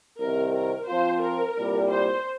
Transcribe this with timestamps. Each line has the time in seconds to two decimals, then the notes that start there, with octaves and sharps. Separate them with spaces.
0.20 C2 C3 D#3 A#4
0.54 A#4
0.88 F3 C4 F4 C5
1.22 A#4
1.56 C2 A#2 G3
1.90 C5